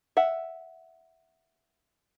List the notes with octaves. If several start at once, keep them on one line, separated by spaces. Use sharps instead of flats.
E5 F#5